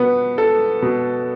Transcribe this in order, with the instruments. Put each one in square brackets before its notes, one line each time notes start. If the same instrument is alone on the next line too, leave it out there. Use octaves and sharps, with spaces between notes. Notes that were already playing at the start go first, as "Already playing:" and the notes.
Already playing: [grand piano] B2 B3
A4
B2